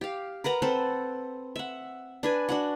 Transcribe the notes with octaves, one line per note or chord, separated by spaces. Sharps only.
G4 F5
A#4 B4 F#5 A#5
C4 A4 B4 C5
E5 F#5
D4 B4 G#5
D4 F#4 F#5